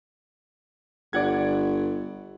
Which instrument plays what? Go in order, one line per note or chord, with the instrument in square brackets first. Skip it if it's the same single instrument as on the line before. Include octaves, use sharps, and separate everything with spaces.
[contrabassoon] G1 [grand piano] D5 F#5 G#6